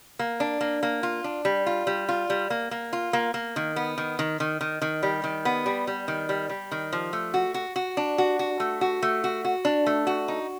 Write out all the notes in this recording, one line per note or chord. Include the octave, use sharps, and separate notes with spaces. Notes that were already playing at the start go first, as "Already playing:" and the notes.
A#3
D4
A#3
A#3
F4
D4
G3
F4
G3
F4
G3
A#3
A#3
F4
A#3
A#3
D#3
B3
D#3
D#3
D#3
D#3
D#3
G3
D#3
B3
G3
G3
D#3
G3
G3
D#3
F3
A3
F#4
F#4
F#4
D4
F#4
F#4
A3
F#4
A3
F#4
F#4
D4
A3
F#4
D#4